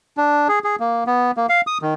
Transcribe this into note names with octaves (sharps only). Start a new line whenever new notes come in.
D4
G#4
G#4
A#3
B3
A#3
F5
D#6
D#3